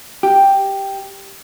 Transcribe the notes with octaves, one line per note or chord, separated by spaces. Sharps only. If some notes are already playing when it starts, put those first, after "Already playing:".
G4